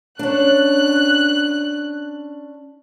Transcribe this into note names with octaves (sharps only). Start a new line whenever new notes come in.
C#4 D4 F#6